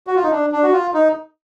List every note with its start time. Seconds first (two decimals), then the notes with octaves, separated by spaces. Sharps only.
0.07 F#4
0.16 F4
0.23 D#4
0.31 D4
0.52 D4
0.63 F#4
0.72 F4
0.94 D#4